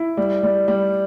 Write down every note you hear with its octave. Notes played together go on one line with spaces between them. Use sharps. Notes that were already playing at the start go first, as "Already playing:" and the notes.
Already playing: E4
G3
G3
G3